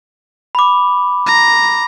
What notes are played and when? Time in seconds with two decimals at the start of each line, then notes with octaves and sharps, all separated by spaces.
0.55 B5 D6
1.26 A#5